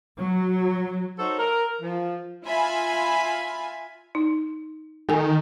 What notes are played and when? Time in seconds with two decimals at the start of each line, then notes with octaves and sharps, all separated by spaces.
0.18 F#3
1.18 D#4 F#4 A4 C5 C#5
1.38 A#4
1.81 F3
2.45 F4 E5 G#5 B5
4.15 D#4
5.09 D#3 A4 G#5